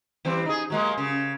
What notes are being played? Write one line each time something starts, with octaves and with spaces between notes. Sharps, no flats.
E3 G3 C4
D#4 G#4
F#3 G#3 A#3
C#3